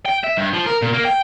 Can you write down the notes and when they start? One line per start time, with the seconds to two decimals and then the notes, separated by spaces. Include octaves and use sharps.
0.06 G5
0.24 E5
0.37 G2
0.53 F3
0.66 A#4
0.82 A#2
0.93 A#3
1.05 G5